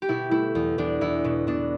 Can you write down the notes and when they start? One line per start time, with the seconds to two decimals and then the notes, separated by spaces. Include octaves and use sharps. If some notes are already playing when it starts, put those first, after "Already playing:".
0.02 G4
0.09 B2 E4
0.31 A3 E4
0.55 E2
0.78 E2 D4
1.01 E2 E4
1.24 B2
1.47 B2 D4